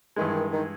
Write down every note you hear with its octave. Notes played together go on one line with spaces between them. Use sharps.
G2 D#3 E3 G#3
D#3